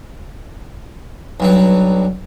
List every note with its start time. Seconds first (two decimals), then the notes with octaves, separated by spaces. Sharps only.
1.40 B1 G2 F#3